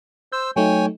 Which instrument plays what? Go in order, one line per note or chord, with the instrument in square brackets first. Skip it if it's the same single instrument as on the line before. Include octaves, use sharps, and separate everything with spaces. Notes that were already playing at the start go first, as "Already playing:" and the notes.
[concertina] C5 E6 [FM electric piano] G6
[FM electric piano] F#3 A3 D#4 [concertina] C#5 G5 G#5